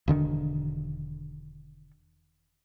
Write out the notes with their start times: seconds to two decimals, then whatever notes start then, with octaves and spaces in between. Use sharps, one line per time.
0.08 E1 D3 D#3 D4